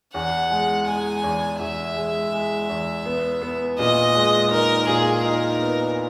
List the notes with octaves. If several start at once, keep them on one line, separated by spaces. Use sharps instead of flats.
E2 F#5
G#3
G#3 G#5
E2
E2 E5
G#3
G#3
E2
B3
B3
A#2 D#5
G#3
D#4 A#4
A#2 G#4
D#4 A#4
B3